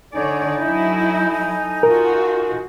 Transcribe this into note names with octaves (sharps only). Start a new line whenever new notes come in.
D3 D#4 A4 C#5 D5 G#5
F#3 E4
F4 F#4 A#4